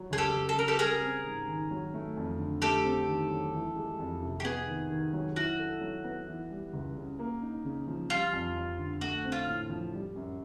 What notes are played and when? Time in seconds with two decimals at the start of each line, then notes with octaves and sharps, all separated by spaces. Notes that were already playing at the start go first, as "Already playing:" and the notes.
Already playing: F#3
0.11 C#2 G#4
0.18 G4 A4
0.33 C#2
0.49 A4
0.56 C#3 A#4
0.68 G4 A4
0.79 G3 G#4 A#4
1.01 C4
1.24 G#2
1.47 D#3
1.71 F#3
1.94 A3
2.17 F2
2.39 D3
2.62 A3 G4 A4
2.85 C4
3.08 D#3
3.30 F#3
3.53 E3
3.76 G#3
3.99 F2
4.22 C3
4.40 G4
4.45 B3 G#4
4.67 D#3
4.90 D#3
5.13 F#3
5.36 E4 F#4
5.59 A4
5.81 F#3
6.04 B3
6.27 E3
6.50 G3
6.73 C#2
6.96 C#3
7.19 A#3
7.42 D#4
7.65 C#3
7.87 F3
8.10 G3 F4
8.33 F2
8.56 F2
8.79 D3
9.01 A3 F#4
9.25 C4
9.32 F4
9.47 A2
9.70 F3
9.93 G3
10.16 F#2